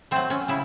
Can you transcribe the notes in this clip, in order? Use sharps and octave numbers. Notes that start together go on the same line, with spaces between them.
F#3 A3 C4
C#4
C#3 E4